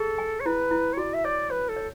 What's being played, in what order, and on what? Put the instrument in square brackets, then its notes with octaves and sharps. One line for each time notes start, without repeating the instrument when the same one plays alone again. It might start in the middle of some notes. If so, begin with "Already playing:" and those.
Already playing: [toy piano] G#4 [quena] A4
[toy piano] G#5
[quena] C#5
[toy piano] E4 [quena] B4
[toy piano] E4
[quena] C#5
[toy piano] F#4 [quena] D5
[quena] E5
[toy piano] C#5 [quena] D5
[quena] B4 [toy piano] C#5
[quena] A4
[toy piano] C#5